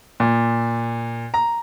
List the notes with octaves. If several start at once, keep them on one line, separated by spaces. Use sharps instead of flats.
A#2
A#5